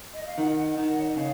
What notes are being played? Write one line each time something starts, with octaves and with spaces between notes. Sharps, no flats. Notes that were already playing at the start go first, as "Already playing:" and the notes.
D#5
F5
D#3 D#5 F#5
D#3 D#5 F#5
C#5
D#5
C#3 C#5 F5